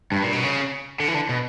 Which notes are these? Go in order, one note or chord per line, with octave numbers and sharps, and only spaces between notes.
G2
A#2
B2
C#3
D3
E3
D3
B2